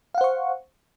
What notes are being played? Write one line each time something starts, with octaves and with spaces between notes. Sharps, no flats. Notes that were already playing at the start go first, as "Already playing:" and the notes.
C5 F5 F#5 C#6